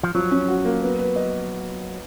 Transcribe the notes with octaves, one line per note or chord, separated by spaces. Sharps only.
F3
F3 F#3
C#4
F#4
A#3
B3
B4
D#5